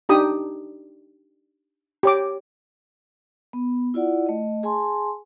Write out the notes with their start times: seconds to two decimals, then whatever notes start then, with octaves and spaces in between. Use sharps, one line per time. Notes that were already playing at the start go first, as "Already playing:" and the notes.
0.09 D4 D#4 G4 D#6
2.03 G4 C#5 D6
3.53 B3
3.94 E4 F4 D5 F#5
4.26 A3 D#5
4.63 G#4 G#5 A5 C6